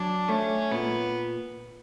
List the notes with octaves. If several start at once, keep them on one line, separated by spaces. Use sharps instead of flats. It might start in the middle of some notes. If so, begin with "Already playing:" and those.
Already playing: F#3 D4
A3 C#4
A#2 B3